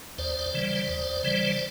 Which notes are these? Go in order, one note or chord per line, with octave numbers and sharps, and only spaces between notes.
D#2 C5 D5
C#3 E3 G3
D#2
C#3 E3 G3